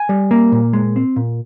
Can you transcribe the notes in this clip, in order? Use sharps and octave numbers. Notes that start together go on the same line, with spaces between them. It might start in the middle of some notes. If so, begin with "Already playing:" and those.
Already playing: G#5
G3
A#3
A#2
G#3
C4
A#2